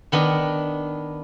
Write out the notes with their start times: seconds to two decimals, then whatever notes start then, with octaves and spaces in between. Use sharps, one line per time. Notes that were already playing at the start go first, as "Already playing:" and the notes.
0.12 D#3 B3 D4